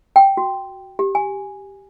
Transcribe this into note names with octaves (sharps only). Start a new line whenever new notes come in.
G5
F#4
G4
G#5